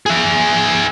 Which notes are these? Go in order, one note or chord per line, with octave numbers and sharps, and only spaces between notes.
G#4 E5